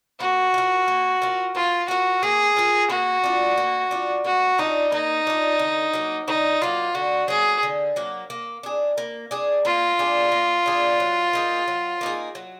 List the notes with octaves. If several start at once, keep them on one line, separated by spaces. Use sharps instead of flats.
A#3 F#4
F4 A#4
A#3
F4 A#4
A#3 F4
F4 F#4 A#4
A#3 G#4
F4 A#4
A#3 F#4
D4 F4
A#3
D4 F4
A#3 F#4
D4 D#4 F4
A#3 D#4
D4 F4
D3
F#3 A#3
D3 D#4
F#3 A#3 F4
D3 F#4
F#3 A#3 G#4
D3
F#3 A#3
A#3
D4 G#4
A#3
D4 G#4
A#3 F4
D4 G#4
A#3
D4 G#4
F#3
A#3 D#4 G#4
F#3
A#3 D#4 G#4
F#3